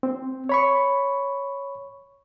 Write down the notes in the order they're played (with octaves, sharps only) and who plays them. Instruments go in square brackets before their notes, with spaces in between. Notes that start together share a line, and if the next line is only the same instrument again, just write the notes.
[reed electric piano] C4
C#5 B5 C#6